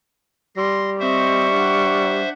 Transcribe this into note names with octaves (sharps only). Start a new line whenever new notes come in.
G3 C6 A#6
C4 C5 D#5 E5 C#6
D4 F#5